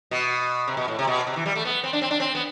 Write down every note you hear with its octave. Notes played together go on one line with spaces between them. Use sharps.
B2
C3
B2
A2
C3
B2
C3
E3
G3
A3
B3
C4
D4
C4
D4
C4
B3